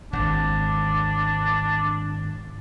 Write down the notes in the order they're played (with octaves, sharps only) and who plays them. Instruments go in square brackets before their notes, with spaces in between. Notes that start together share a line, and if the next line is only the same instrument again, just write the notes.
[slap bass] G#1 [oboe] D4